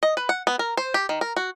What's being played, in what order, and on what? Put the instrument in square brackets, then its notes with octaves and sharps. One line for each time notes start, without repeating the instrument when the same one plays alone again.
[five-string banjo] D#5
B4
F#5
B3
A#4
C5
G4
D#3
A#4
F#4